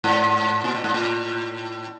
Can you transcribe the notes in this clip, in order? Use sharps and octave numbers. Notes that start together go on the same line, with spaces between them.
G#2
A#2
A2
G#2
A2